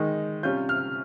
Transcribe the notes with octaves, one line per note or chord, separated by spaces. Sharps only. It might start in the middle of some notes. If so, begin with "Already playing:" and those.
Already playing: D#3 G#3 D#4
C3 G3 C#4 F4 G6
F6